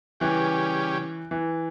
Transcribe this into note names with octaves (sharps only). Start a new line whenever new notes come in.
C#3 E3 G3 C#4 G4
E3